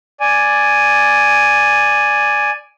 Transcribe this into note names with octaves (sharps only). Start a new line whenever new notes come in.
D5 G#5